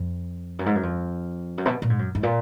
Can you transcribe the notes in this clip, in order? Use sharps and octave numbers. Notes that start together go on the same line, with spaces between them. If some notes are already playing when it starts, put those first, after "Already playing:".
Already playing: F2
F#2
G#2
F#2
F2
F#2
B2
A#2
G#2
F#2
G#2
A#2